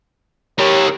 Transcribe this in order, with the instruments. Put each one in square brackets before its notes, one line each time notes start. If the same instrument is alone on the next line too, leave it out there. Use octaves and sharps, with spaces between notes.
[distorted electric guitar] G4 A#4 [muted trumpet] C#5